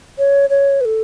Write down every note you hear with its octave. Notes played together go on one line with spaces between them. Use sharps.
C#5
C#5
B4
A4